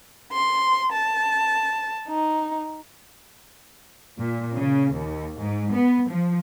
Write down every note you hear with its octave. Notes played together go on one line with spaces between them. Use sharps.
C6
A5
D#4
A#2
C#3
D#2
G#2
B3
F3